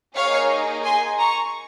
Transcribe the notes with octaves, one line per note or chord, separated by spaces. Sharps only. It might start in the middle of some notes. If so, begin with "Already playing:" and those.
A#3 D#4 G#4 C#5 F5
G#5 C6
A#5 C#6